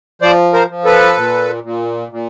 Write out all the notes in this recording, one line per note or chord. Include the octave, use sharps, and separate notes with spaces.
F3 C5 D5
A#4 C5
F3
A4 B4
A#2
A#2
A#2